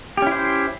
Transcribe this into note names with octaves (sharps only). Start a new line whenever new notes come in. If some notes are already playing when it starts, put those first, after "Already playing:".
C#4 E4 G4 C5